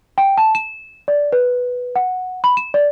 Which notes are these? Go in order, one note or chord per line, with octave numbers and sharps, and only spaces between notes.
G5
A5
E7
D5
B4
F#5
B5
E7
D5